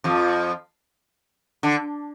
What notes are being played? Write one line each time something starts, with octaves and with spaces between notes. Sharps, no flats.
F2 F3
D3